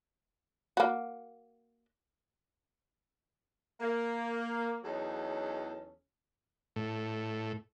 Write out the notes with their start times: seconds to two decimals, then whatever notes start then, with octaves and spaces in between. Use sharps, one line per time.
0.77 A#3 F#4
3.80 A#3
4.84 E2 F#3 C#4 D#4 G#4 A4
6.76 A2